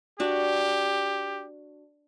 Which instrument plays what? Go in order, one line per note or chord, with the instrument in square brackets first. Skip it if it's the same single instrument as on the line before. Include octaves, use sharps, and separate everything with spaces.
[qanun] D4 F#4 [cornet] G4